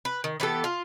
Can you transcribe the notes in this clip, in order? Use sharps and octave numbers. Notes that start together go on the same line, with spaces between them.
B4
D#3
E3 B3 G4 A4
F4